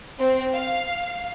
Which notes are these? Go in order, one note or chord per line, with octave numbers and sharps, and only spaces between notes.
C4
F5